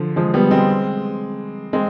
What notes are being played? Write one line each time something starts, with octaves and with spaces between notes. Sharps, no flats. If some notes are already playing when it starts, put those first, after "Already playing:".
Already playing: D3 F3
F3 G#3
G3 B3
G#3 C4
G#3 C4